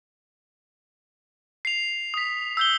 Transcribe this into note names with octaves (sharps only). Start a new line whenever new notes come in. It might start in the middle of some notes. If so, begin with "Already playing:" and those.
C7 F7
D#6 B6
E6 G6 G7